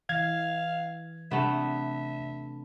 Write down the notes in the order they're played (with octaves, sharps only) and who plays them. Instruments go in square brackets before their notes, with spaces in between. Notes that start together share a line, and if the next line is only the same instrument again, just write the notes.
[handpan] E3 [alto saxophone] F5 [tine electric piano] G#6
[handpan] C3 D4 [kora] A3 B3 [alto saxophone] E5